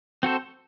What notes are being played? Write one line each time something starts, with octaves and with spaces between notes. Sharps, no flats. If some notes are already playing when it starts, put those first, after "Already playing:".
C4 F#4 A4 C5